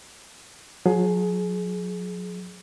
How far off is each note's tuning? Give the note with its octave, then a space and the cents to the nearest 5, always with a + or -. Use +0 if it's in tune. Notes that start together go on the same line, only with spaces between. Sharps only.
F#3 -40 G#4 +25